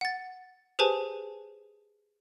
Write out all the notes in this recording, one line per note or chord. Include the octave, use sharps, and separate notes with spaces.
F#5 A6
G4 G#4 B4 C5 G#5 A5